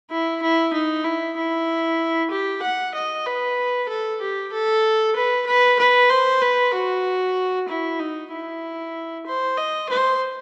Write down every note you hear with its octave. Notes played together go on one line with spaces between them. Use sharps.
E4
E4
D#4
E4
E4
G4
F#5
D#5
B4
A4
G4
A4
B4
B4
B4
C5
B4
F#4
E4
D#4
E4
C5
D#5
C5